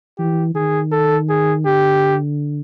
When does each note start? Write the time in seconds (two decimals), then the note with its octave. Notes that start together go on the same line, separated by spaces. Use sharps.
0.18 E3 G4
0.55 D#3 G#4
0.92 A4
1.29 G#4
1.65 D3 G4